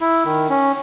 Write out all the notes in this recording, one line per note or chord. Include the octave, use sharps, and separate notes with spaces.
E4
D#3
C#4